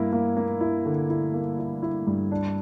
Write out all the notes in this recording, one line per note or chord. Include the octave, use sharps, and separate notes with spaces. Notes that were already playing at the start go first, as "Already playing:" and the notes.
Already playing: G2 A#3 E4
A#3
A#3
E4
D3
E4
A#3
E4
E4
G2
D4